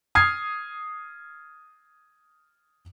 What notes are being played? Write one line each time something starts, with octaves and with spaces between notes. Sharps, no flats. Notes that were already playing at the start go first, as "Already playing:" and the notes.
D#6 F6 G#6 C7